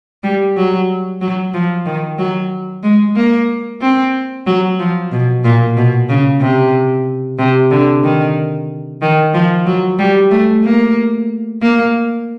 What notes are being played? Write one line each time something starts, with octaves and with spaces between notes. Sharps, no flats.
G3
F#3
F#3
F3
D#3
F#3
G#3
A#3
C4
F#3
F3
B2
A#2
B2
C#3
C3
C3
D3
D#3
D#3
F3
F#3
G3
A3
A#3
A#3